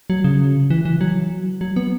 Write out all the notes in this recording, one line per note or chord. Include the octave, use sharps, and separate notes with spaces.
F#3
C#3
E3
E3
F#3
F#3
B3